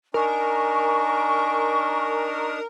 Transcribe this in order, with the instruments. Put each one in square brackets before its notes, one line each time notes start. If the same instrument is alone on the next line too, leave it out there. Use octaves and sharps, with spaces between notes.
[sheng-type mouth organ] D4 D#4 [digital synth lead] A#4 [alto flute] G#5 [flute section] C#6